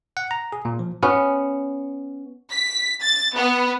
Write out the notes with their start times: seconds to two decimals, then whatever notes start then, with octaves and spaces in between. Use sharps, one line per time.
0.17 F#5
0.31 A#5
0.53 G#4
0.65 A#2
0.79 F3
1.02 B3 C#4
2.53 B6
3.02 A6
3.36 B3